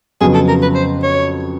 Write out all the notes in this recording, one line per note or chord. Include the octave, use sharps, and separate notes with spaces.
F2 C#3 F#3 B3 G#4
A4
A#4
B4
C5
C#5